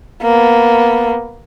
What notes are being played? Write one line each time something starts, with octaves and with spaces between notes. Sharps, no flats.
A#3 B3